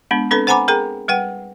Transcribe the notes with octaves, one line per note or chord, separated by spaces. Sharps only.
G#3 B3 D4
C4 D4 A4 B4 B5
C5 F#5 G#5 A#5 B5 D6
G#4 A#4 G5 A#5
G3 B4 F#5 G5